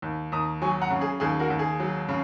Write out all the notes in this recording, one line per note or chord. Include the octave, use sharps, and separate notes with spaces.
D#2
D#2 A#5 D#6
F#3 G#5 C#6
F#5 A#5
C#3
G#4
D#2 G#4
F#4 A#4
D#2
G#4
F#3
C#3